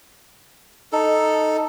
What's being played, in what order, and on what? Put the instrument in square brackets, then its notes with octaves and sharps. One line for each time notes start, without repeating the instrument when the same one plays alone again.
[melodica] D#4 A4